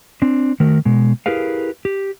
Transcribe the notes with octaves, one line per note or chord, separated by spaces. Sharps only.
C4 D4
D#3 A3 F#4 A#4
B2 G#3
E4 G4 G#4 A#4 B4 F5
G4